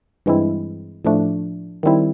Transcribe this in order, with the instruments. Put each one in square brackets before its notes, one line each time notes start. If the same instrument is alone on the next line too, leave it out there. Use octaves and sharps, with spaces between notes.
[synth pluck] G2 E3 G#3 C4 E4
A2 F3 A3 D4
D#3 G3 C4 E4